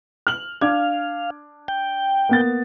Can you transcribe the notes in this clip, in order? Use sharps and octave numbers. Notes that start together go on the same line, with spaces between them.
F6 F#7
D4 F5 D6 G#6
G5
A#3 B3 A6